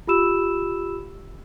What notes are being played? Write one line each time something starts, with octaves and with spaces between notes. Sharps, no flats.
F4 G4 B5 E6 E7